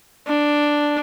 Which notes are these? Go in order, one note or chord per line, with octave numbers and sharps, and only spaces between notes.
D4